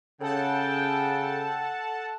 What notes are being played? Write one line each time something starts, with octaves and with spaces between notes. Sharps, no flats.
C#3 A4 F#5 G5 A5